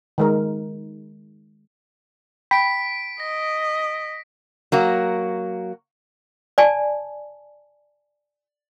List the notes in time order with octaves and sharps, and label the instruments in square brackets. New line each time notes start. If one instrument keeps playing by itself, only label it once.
[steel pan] D#3 G#3 A#4
[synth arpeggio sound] G5 B5 [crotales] B6 D7
[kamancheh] D#5 [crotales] A#6
[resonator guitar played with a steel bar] F#3 A#3 F#4
[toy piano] D5 G#5 A5